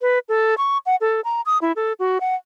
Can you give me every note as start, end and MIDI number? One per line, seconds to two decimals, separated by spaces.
0.02 0.19 71
0.29 0.55 69
0.58 0.78 85
0.86 0.96 78
1.01 1.21 69
1.24 1.41 82
1.46 1.58 87
1.62 1.72 64
1.76 1.93 69
1.99 2.18 66
2.21 2.35 78